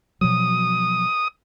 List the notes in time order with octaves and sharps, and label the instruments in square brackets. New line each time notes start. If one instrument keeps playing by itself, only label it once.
[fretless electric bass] B2 F3 F#3 [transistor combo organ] D#6